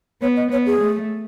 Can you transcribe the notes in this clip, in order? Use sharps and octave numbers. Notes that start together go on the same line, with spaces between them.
B3 C#5
D#5
B3 C#5
G#4
A3